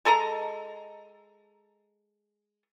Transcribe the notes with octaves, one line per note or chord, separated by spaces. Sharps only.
G#3 A4 D#5 A#5